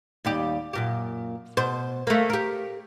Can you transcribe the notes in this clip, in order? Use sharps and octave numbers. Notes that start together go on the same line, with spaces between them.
D#2 G3 G4
F#2 A#2 G4
B2 C5
A3 A#3
G4 A#4